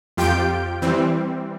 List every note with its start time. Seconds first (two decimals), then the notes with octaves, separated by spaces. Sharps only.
0.17 F2 F4 G4 G5 G6 D7
0.82 E3 G3 C4